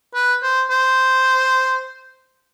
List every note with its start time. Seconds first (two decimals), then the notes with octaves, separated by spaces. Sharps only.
0.14 B4
0.43 C5
0.70 C5